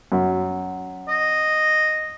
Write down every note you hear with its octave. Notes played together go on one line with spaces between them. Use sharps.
F#2
D#5